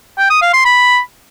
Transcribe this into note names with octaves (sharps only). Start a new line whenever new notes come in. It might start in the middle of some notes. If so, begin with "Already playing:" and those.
G5
D#6
F5
C6
B5